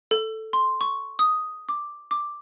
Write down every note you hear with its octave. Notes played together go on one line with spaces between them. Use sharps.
A4
C6
C#6
D#6
D6
D6